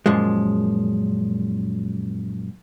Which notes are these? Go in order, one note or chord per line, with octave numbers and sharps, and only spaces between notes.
F#2 A#2 F3 G#3